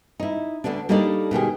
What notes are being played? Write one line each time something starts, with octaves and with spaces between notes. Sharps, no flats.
D#4 E4
D2 G#2 D3 B3 D4
G3 A#3 D4 D#4 A4 D5
B2 D#3 G4 G#4